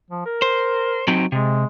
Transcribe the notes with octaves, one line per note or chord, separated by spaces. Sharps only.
F3
A#4
C5
F#3 C4 D#4
C3 G#3